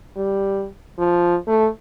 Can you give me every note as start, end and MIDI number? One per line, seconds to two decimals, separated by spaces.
0.16 0.66 55
0.98 1.35 53
1.47 1.66 57